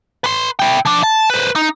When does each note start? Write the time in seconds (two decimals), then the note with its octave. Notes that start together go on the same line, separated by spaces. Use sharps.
0.24 B4 C6
0.59 E4 G5
0.85 F3 D4
1.03 A5
1.30 B4 C5
1.56 D#4